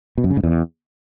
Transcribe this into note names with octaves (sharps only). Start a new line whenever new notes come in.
B2
F#2
C#3
G#2
E2